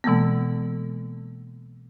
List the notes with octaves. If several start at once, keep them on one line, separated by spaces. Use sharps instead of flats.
B2 E3 G#3 A#3 B3